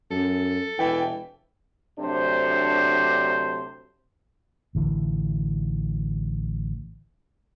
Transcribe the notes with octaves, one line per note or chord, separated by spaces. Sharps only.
F#2 A4
E1 E3 G5
D2 C3 F#3 D4 C5
A1 D3 E3